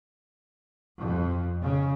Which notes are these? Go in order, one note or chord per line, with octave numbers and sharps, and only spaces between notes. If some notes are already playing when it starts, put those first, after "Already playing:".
F2
C#3